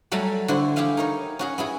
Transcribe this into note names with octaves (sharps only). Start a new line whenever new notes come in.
F#3 G3 A3 A4 G#5 A#5
D3 E4 F#4 C5
E4 G4 G#4 E5 F5 G#5
D#4 A#4 C#5
C#4 F#4 G#4
B3 E4 G#4